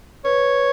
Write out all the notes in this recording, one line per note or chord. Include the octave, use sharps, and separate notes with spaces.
B4 C#5